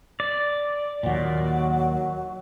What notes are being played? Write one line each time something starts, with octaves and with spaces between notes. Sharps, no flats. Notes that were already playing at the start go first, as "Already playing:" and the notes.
D5
D#2 A#2 F#3